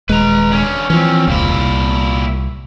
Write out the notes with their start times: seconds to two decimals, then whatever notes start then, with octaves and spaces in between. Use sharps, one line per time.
0.09 D#1 G#3 B4 A#5
0.52 D3 C#4
0.90 E3 F3 C4 C#4
1.27 E1 C#2 A#2 E4
1.54 C2